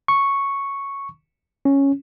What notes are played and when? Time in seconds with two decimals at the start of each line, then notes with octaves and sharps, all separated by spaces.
0.08 C#6
1.65 C#4